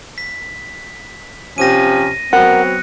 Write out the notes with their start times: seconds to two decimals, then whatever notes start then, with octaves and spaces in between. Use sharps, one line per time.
0.18 B6
1.58 C3 F3 C#4 A#6 D#7
2.33 F#3 B3 C4 A#4 F#5 F#6 C#7